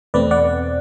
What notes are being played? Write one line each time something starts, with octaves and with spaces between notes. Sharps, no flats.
E2 B2 A3 C4 B4 D5
D5 F#5